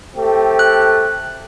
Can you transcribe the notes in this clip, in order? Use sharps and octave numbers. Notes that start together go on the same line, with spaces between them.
A3 C4 G4
F#6